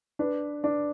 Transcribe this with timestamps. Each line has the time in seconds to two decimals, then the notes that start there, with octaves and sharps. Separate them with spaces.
0.19 D4 B4
0.64 D4